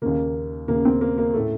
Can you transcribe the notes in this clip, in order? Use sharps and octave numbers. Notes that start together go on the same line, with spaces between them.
D#2 C#3 A#3
D#2 C#3 A#3
C4
A#3
A#3
A2 A3